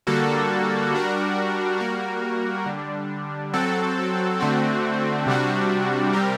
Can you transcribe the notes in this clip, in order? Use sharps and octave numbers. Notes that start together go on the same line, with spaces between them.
D3 G3 A#3 F#4 A4
G3 D4 F#4 A#4
G3 A#3 F#4 A#4
D3 G3 D4
F#3 C4 F#4 A4
D3 A3 C4 F#4
C3 G3 D4 F#4
C3 G3 C4 G4 A#4